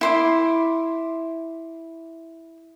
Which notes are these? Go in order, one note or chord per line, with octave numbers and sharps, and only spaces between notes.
E4 C6 D6